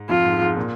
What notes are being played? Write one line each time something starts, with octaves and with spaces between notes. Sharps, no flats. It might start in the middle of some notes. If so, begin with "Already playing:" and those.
Already playing: G#2
F2 F4
G#2
G#2
A#2